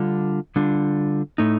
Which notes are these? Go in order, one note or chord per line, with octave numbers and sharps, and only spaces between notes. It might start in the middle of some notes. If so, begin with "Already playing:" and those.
Already playing: D3 G3 D4 F4
D3 G3 D4 F4
A2 A3 D#4